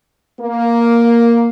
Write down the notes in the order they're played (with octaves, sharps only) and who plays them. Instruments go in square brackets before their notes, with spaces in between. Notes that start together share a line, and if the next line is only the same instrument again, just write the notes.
[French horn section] A#3